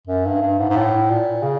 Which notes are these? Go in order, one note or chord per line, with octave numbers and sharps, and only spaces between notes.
F#2
G2
G2
G#2
G#2
A2
A#2
C#3